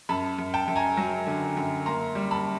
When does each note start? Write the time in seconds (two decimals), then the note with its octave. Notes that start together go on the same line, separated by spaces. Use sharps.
0.09 F#2 A5 B5
0.38 F#2
0.54 G5 A5
0.68 F#2
0.76 G#5 A#5
0.97 F#3
1.27 D3
1.57 F#2
1.86 A#3 A#5 C6
2.15 G3
2.31 A5 B5